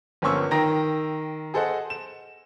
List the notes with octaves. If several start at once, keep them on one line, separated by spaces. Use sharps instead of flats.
G1 F3 A#3 C#4 C#6 E6
D#3 G5 A#5 A#6
G#4 A4 C5 D#5 F#5
E7